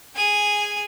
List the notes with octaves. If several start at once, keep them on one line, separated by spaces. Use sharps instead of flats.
G#4 G#5